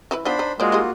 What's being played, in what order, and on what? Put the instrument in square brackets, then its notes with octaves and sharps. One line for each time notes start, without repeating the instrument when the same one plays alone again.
[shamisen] E3 E4 B4
[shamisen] B3 D#4 F4 [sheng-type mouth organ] D4 C5 B5
[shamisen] D#4
[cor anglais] G#3 [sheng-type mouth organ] A#3 F4 F#4 [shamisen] C5 D5
[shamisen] G3 D#4 G#4